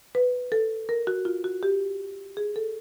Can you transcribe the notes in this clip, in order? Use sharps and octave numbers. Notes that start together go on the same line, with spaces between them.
B4
A4
A#4
F#4
F4
F#4
G4
G#4
A4